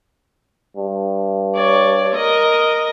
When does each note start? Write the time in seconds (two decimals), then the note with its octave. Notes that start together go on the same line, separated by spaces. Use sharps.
0.77 G2
1.55 C#5 D5
2.15 A#4 D#5